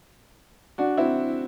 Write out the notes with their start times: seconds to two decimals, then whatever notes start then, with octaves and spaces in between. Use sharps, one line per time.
0.78 D4 F#4
0.97 C4 E4